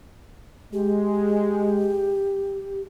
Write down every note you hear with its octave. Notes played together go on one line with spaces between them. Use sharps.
G#3 G4